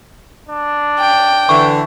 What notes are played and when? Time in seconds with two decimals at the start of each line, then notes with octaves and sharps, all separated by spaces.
0.49 D4
1.00 G5
1.49 D3 E3 C#6